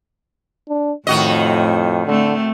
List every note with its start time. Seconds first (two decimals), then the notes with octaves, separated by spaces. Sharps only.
0.69 D4
1.07 F2 A2 D#3 F#4 D#5
2.06 D3 A3 C4